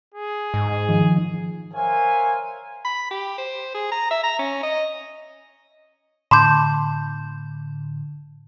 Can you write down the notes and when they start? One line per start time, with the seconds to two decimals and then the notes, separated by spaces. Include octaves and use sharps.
0.14 G#4
0.54 G#2
0.89 D#3 F3
1.74 A#4 C5 C#5 E5 F5 G#5
2.85 B5
3.11 G4
3.38 C5
3.74 G#4
3.92 A#5
4.11 E5
4.24 A#5
4.39 C#4
4.63 D#5
6.31 A2 D3 A5 B5 C6 D6 G6